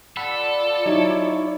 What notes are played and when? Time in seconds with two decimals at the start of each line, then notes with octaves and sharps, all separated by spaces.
0.17 F4 A4 D5 F#5 B5 E6
0.86 F#3 D#4 E4 C#5